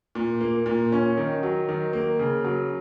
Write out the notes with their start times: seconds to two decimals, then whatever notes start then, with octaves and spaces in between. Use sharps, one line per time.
0.15 A#2
0.41 A#3
0.66 A#2
0.92 C#4
1.17 D#3
1.43 F#3
1.69 D#3
1.93 A#3
2.19 C#3
2.44 F#3